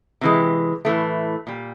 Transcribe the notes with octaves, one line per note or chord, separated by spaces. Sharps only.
C3 E3 G#3
A2 E3 A3
A#2 G3